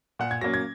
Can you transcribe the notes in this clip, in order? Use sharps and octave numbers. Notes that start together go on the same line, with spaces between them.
A#2 F#5
G#6
F#3 A#3 C#4 A#6
G#6